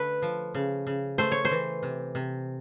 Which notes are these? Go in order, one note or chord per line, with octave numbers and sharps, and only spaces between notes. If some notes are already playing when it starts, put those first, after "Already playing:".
Already playing: D3 A3 B4
F3
C#3
C#3
A3 C5
C#5
C5
E3
C3
C3